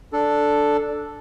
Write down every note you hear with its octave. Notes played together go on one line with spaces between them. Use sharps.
D4 A4